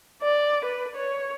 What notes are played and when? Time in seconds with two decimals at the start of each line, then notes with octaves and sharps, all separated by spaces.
0.22 D5
0.65 B4
0.96 C#5